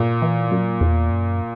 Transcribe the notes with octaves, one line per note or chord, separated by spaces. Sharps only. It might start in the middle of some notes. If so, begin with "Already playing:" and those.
Already playing: A#2
E3
F#2
E2
F#2